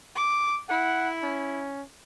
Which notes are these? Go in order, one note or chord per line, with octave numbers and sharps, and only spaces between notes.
D6
E4 F#5
C#4